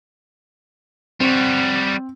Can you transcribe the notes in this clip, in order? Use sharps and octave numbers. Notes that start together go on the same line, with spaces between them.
G3 C4 F#4